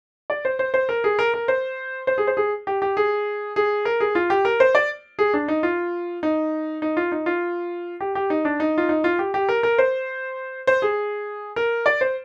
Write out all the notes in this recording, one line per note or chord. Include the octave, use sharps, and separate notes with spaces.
D5
C5
C5
C5
A#4
G#4
A#4
A#4
C5
C5
G#4
C5
G#4
G4
G4
G#4
G#4
A#4
G#4
F4
G4
A#4
C5
D5
G#4
D4
D#4
F4
D#4
D#4
F4
D#4
F4
G4
G4
D#4
D4
D#4
F4
D#4
F4
G4
G4
A#4
A#4
C5
C5
G#4
A#4
D5
C5